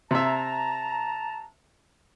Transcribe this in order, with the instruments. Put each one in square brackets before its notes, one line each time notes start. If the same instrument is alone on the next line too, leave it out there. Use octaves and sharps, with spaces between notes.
[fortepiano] C3 E5 [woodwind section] A5 A#5